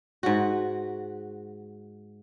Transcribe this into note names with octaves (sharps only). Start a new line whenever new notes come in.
G#2 F#4